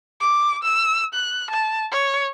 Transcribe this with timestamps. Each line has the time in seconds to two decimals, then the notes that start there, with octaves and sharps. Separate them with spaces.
0.20 D6
0.64 E6
1.14 F#6
1.51 A5
1.91 C#5